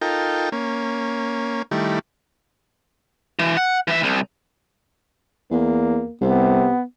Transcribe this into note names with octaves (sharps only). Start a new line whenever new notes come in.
D#4 F4 A4 A#4 G5
A#3 C#4
D#3 G3 A3 E4
E3
F#5
E3 E5
C2
E2 A#3
C2 C3 B3